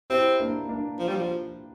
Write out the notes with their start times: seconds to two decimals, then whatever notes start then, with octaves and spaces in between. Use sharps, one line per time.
0.10 C4 E4 G4
0.40 A#3 D4
0.69 A#3 D4
0.98 F3
1.08 G3
1.15 F3